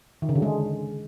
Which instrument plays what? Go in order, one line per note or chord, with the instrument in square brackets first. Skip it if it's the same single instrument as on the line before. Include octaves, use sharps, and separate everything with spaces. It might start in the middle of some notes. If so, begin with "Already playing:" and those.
[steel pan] D#3
C#3
D3
G#3